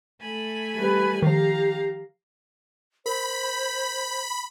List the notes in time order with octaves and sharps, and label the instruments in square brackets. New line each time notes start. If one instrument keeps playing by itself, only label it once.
[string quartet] A3 G#5 B5
[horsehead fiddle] G3 B4
[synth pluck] D#3 F3 [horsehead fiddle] G4 [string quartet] F5 A#5
[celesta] A#4 [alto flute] C5 [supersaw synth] B5